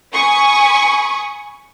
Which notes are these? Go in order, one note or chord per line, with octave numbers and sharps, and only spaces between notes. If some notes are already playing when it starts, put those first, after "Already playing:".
G#5 B5 C#6 D#6